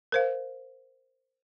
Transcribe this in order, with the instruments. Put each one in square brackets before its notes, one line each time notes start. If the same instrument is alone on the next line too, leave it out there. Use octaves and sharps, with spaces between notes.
[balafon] A#4 C5 F5